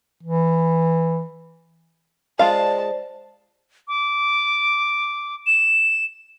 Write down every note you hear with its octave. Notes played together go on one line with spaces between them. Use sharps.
E3
G#3 F4 C5 D5 F5 A5
D6
E7